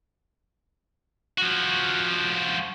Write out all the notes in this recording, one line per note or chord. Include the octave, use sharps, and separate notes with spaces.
F3 F#4